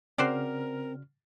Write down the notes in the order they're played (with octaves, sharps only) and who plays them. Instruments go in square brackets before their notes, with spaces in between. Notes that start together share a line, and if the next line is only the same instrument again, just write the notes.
[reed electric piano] C#3 F6 [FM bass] C4 [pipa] F#4 C5 D5 [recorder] A#4